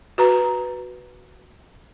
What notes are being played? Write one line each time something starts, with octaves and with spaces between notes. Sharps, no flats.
F#4 B4 A#5